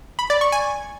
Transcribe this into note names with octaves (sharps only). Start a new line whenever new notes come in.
B5
D5
C#6
G#5